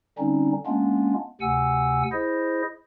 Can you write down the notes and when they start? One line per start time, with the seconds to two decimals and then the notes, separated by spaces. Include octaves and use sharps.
0.19 D3 G3 C4 C#4 D#4
0.67 G#3 A#3 B3 C#4 D4 F4
1.41 D2 C3 F#5 G#5 E6
2.12 E4 G#4 C5 D#5